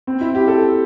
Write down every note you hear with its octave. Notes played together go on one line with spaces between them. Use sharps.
C4
E4
G4
A4